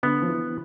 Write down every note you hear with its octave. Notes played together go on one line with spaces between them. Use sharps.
D3 B3
F3
E3